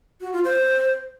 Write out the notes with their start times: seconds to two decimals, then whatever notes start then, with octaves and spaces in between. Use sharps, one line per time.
0.21 F#4
0.33 F4
0.44 C5